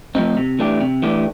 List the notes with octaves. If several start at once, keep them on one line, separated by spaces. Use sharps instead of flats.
F3 A3 C4 D#4
C3
E3 A3 D4 G4
C3
E3 A3 D4 G4